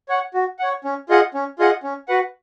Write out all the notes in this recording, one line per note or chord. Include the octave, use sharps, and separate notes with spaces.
C#5 F#5
F#4
C#5 F#5
C#4
F4 G#4 D#5 F#5
C#4
F4 G#4 D#5 F#5
C#4
F#4 B4 F#5